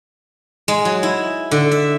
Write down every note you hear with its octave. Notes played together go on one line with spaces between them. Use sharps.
G#3
F#3
E4
D3
E5